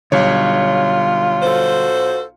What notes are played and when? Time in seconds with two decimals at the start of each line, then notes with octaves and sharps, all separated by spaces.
0.12 B1 D3 G3 F4 C#5
1.43 F#4 A4 C5